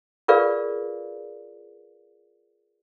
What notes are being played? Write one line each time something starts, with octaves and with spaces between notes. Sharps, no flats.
F4 G#4 A#4 B4 D5 F5